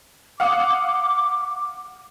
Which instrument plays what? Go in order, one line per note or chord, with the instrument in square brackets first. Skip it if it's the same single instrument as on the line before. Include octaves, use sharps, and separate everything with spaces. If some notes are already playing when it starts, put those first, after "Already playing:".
[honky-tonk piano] F5 F#5 D#6 [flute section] D6